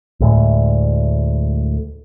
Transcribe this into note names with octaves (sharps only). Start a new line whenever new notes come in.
D2 A2 G#3